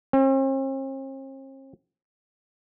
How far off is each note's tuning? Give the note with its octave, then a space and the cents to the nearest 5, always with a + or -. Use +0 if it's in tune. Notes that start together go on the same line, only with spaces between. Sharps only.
C4 +45